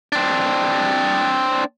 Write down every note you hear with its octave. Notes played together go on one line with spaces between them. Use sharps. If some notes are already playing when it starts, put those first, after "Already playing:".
C4 D4